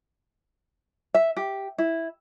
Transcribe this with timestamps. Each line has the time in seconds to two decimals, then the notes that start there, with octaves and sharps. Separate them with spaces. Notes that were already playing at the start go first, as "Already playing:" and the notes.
1.14 E5
1.37 G4
1.78 E4